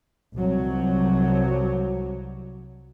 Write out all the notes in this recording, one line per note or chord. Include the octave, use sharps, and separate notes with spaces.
C2 F3 F#3